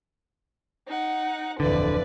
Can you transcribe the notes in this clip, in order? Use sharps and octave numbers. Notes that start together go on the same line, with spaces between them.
D#4 F#5
D1 F2 D3 E3 B4 D5